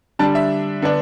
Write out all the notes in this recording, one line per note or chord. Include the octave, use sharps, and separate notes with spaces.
D3 G3 D4 A5
E5
D3 B3 D4